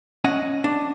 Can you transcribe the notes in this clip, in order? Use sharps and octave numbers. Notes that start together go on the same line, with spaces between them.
C#4 D#5 F#5
D4